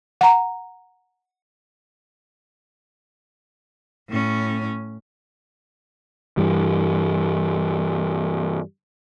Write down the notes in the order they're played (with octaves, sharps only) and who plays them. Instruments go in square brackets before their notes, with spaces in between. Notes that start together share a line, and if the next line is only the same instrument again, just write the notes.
[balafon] F#5 A#5
[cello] A2 C#4
[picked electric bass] G2 E3 G3